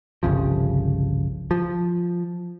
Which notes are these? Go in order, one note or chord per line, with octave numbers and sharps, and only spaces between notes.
G1 C2 C#3 F3
F3